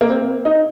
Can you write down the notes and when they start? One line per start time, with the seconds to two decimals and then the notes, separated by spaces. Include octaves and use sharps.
0.01 A#3
0.10 C4
0.45 D#4